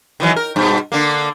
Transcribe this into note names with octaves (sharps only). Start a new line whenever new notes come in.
D#3 E3 F#3
A#4
G2 B2
D3 A#3